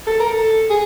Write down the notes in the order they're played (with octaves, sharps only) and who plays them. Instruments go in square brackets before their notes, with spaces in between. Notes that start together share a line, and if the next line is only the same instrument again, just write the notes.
[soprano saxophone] A4
A#4
A4
G#4